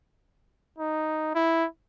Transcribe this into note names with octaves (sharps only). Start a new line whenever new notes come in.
D#4
E4